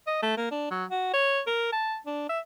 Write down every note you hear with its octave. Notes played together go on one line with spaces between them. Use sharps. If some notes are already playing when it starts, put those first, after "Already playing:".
D#5
A3
A#3
D4
F#3
F#4
C#5
A#4
A5
D4
E5